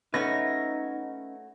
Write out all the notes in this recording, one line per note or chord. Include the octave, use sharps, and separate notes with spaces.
A3 C#4 D#4 F#4 B4 C#5 A#6